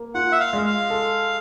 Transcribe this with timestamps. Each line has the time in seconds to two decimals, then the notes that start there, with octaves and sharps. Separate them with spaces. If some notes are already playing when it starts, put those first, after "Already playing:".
Already playing: A#3
0.15 F4 F#5
0.32 E5
0.40 F5
0.53 G#3
0.66 F5
0.90 A4